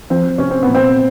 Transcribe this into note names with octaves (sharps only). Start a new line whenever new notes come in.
F3 C4
C3 C#4
C4
A#2 B3
C4